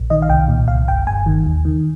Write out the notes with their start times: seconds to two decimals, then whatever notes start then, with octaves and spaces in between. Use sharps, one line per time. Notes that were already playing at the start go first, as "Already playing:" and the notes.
Already playing: A#1
0.10 D#3 D#5
0.22 F5
0.29 C2 G5
0.48 A#2
0.68 C2 F5
0.87 G1 G5
1.07 G1 G#5
1.26 D#3
1.46 D#2
1.65 D#3